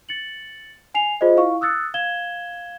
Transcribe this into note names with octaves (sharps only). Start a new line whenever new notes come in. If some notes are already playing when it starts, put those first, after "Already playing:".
A6 C#7 F#7
G#5 C7 F7
F4 G#4 C5 D#5
E4 F5 C#6
D#6 E6 F#6 A6 C#7
F5 G#6 E7 G7